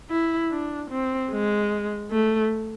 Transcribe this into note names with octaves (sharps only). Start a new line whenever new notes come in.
E4
D4
C4
G#3
A3